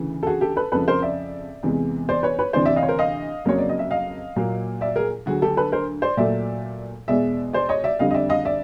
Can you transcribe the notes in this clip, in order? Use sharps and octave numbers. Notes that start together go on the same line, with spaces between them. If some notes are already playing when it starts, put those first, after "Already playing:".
Already playing: D2 C#3 E3
A4
F#4 G#4
G4 A4
A4 B4
F2 C#3 F3 A4 B4
A#4 C5
D5 E5
E2 C3 E3 G#3
C5 D5
B4 C#5
B4 C#5
D2 C3 E3 C5 D5
D5 E5
D#5 F5
C#5
A#4 C5
D#5 F5
F2 C#3 F#3 A#3 C#5
D5
D#5
E5
D#5 F5
A#2 F#3 A#3
D5 E5
G#4 A#4
D2 D3 F#3 F#4 G#4
G4 A4
A4 B4
A#4 C5
C5 D5
A#2 F#3 A3 D5 E5
E2 B2 G#3 D5 E5
C5 D5
C#5 D#5
D5 E5
F2 D3 G3 D#5 F5
D#5
D5 E5
D#5 F5
D5 E5